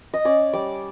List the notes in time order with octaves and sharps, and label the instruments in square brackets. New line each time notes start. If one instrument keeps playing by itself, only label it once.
[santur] D#5
C#4 D5
G3 D5